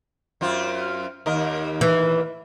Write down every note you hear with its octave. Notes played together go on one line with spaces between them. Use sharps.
F#2 C4 F4
D#2 A#4 D#5
E3